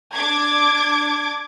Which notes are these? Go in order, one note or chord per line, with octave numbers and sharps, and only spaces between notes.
D4 D6 G#6